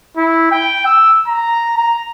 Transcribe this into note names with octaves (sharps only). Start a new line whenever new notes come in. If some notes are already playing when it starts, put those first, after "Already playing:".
E4
G5
E6
A#5
A#5